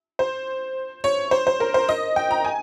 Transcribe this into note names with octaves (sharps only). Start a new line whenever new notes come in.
C5
C#5
C5
C5
A#4
C5
D#5
G5
A#5
G#5